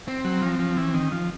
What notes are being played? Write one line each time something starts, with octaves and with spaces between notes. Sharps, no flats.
C4
F#3
F3
F3
E3
D#3
F3